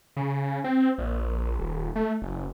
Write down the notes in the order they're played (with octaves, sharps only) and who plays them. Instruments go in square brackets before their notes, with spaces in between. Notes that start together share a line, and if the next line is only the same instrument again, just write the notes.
[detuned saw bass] C#3
C4
A#1
D#1
A3
F#1